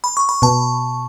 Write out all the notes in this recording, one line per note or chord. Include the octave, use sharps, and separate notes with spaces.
B5
C#6
B5
B2 A5